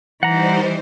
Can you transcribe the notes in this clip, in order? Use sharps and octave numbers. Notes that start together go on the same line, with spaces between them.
E3 G3 D#4 C5 F#5 A#5